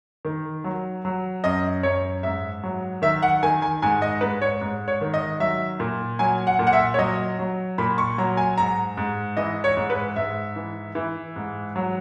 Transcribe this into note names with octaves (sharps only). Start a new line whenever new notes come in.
D#3
F#3
F#3
F#2 D#5
F#2 C#5
G#2 E5
F#3
D#3 E5
F#5
D#3 G#5
G#5
G#2 G#5
D#5
G#2 B4
C#5
G#2
C#5
D#3
D#5
F#3 E5
A#2
F#3 G#5
F#5
A#2
F#5
E5
C#5
F#3 D#5
F#3
A#2 B5
C#6
F#3 A#5
G#5
G#2 A#5
G#2
E3 D#5
C#5
G#2
B4
G#2 E5
E3
E3
G#2
F#3